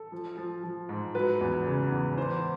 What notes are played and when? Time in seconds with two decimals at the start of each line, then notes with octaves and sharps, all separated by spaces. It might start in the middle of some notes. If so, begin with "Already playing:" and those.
Already playing: A4
0.12 F3
0.37 F3
0.64 F3
0.89 G#2
1.15 F#3 B4
1.41 E2
1.66 C#3
1.92 E2
2.18 E3 C5